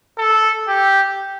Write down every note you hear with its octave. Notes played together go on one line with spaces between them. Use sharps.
A4
G4